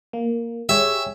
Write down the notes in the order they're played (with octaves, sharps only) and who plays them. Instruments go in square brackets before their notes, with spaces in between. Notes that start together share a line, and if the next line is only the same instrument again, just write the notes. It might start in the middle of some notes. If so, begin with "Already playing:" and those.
[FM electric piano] A#3
[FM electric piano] G4 G#4 C#5 [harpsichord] E5